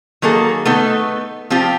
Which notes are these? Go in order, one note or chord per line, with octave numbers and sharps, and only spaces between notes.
D#3 F#3 A#3 G#4 A4
A3 B3 D#4
F3 C4 F4 G4